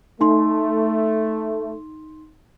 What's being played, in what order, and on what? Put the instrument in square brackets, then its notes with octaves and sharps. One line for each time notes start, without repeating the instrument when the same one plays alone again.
[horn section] A3 [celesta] D#4 C6